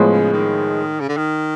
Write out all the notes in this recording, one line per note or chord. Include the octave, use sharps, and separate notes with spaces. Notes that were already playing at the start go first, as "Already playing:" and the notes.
Already playing: A2 F3 G#3 B3
C#3
D#3
C#3
D3
D#3